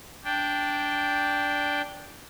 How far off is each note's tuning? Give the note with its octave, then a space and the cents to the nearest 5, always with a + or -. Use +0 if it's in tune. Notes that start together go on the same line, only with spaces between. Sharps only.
D4 -10 G5 +0